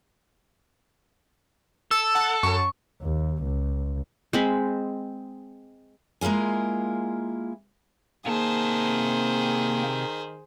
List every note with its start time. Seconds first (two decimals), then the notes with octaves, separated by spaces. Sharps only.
1.91 A4 E6
2.15 F#5 A5
2.43 F#2 A5 C#6
3.02 D#2
3.44 C#2
4.33 G#3 C4 B5
6.21 G#3 A#3 E4 F4 G#4
8.26 C3 D#3 A#3 G#4 C5 A5